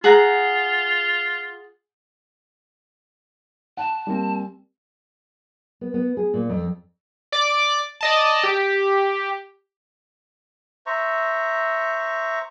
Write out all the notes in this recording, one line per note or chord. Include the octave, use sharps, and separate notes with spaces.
F4 G#4 F#5 A#5
F#5 A5
G3 A#3 C4
B3
B3
G#4
A#2
F2
D5 D6
D5 D#5 A5
G4
C5 E5 A#5 C#6